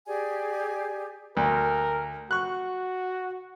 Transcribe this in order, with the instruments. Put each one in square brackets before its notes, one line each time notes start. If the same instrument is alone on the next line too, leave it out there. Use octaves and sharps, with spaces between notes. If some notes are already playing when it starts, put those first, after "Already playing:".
[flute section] G4 G#4 D5 G#5
[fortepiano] D2 [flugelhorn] A#4
[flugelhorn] F#4 [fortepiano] C#6 F#6